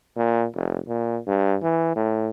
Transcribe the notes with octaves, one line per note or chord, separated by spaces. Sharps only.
A#2
F1
A#2
G2
E3
A2